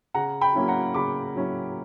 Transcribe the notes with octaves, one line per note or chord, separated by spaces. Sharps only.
C#3 F#5 A#5
G5 B5
F#3 A#3 C#4 E4
F#5 A#5
C#3 B5 D6
F#3 A#3 C#4 E4